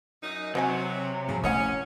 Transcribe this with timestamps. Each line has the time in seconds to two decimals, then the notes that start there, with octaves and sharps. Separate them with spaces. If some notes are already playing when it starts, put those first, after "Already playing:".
0.23 F#2 D#4
0.55 C3 F#3 C5 D#5 G#5
1.28 A#2 C#3 F3 F#3
1.44 A3 C#4 E4 C#5 D#5 F#5